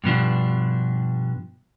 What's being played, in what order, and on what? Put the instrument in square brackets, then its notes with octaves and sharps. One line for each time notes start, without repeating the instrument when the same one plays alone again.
[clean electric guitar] G2 B2 F3 D4